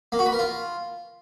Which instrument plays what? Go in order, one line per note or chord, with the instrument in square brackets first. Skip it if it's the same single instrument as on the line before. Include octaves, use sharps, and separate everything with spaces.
[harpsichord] A#3
F#4
B4
A#4
F4